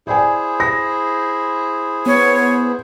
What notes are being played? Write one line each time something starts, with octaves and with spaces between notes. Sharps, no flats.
E4 G#4 C5 D5 G#5
A#6
B3 C#5